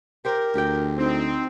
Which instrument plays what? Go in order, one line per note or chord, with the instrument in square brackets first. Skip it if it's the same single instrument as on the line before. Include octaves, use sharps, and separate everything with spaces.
[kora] G4 C5 G5 [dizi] A#4
[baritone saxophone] D2 [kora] G4 G5
[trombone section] C4 [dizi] D#4